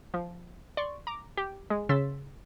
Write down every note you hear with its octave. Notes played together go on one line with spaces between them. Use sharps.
F3
D5 C6 C#6
A#5 D6
G4
G#3
C#3 C6 E6 A6 B6